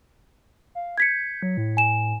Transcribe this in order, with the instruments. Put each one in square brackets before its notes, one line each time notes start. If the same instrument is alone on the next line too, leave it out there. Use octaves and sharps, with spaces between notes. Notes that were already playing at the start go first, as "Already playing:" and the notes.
[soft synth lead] F5
[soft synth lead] G6 [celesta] G#6 B6 C#7
[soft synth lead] F#3
A2
[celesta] G#5 E7